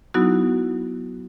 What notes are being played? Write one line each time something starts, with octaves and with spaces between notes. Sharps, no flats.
F#3 B3 D#4 E4 F#4